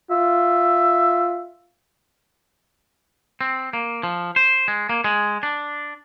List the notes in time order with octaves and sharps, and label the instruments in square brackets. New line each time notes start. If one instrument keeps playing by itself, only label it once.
[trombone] F4 [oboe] E5
[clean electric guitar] C4
A#3
F3
C5
G#3
A#3
G#3
D4